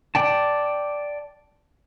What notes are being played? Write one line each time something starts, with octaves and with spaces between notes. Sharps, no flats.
D5 G5 A5